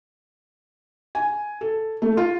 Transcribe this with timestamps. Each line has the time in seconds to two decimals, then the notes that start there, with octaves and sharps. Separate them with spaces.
1.15 G#5
1.61 A4
2.02 A3
2.17 F4